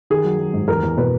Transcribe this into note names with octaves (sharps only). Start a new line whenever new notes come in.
D#3 G#4
F#3
F#3
G#2
E2 A#4
E2
B2 B4